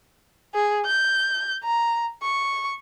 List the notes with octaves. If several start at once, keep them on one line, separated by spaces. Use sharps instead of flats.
G#4
G6
A#5
C#6